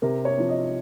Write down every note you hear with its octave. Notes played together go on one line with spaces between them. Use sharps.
C3 A#4
C#5
F3 C4
D#5